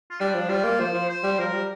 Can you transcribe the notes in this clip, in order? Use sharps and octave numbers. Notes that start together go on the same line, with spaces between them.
F4
G3 D4
F3
G3 F4
A#3
F3 C5
F3
C5
G3
F3 A#4
G3